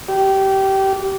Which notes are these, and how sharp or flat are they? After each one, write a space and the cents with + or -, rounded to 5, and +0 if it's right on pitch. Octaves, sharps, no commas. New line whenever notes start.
G4 -20